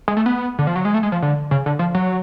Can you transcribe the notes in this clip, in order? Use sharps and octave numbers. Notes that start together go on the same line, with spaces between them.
G#3
A3
B3
D3
F3
F#3
G#3
A3
G#3
F3
D3
C#3
D3
F3
F#3